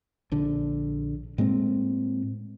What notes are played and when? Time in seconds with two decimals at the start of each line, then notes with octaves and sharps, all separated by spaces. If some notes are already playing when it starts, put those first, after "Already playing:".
0.32 A#1 D3
1.38 A2 G#3 A#3 C4